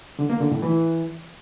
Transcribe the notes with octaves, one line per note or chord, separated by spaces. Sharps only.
D3
A#3
D3
A2
E3